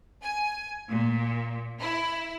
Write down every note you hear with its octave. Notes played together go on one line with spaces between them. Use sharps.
G#5
A#2
E4